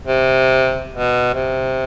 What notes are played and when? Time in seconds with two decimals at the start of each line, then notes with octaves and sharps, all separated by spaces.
0.07 C3
0.92 B2
1.34 C3